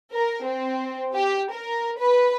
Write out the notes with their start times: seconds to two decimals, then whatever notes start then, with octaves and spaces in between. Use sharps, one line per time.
0.13 A#4
0.45 C4
1.14 G4
1.52 A#4
1.99 B4